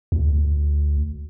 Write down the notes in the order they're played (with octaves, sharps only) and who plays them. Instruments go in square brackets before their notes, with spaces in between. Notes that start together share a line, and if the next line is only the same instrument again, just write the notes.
[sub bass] D2